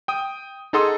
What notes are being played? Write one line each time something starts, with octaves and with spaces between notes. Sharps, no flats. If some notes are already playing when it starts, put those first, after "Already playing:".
G5 D#6
D#4 G#4 A4 F#5 C6 D#6